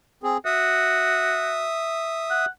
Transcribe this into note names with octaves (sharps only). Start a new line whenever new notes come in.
C4 G#4
F#4 E5 D#6
F#5